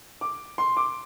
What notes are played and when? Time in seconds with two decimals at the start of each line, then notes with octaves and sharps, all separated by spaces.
0.21 D6
0.58 C6
0.77 D6